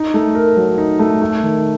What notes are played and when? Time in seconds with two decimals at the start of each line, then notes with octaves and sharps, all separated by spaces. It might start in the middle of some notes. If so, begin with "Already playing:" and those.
Already playing: D#4
0.14 A3
0.35 A#4
0.57 F#3
0.78 D#4
0.99 A3
1.22 A3
1.43 D#3